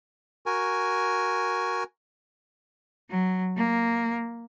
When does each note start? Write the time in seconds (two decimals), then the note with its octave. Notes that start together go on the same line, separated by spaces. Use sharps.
0.46 F#4 A#4 G#5
3.10 F#3
3.56 A#3